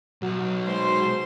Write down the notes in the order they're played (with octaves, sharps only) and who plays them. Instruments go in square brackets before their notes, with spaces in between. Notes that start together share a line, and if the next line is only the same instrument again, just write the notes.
[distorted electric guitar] B1 [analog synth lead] F#3 [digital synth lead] F#4
[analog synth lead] G#3 [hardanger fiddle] C5 C6